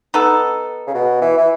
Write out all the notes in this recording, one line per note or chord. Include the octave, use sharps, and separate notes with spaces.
B3 D#4 A4
C#3
B2
E3
E3